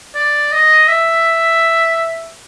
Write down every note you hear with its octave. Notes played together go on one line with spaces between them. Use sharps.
D5
D#5
E5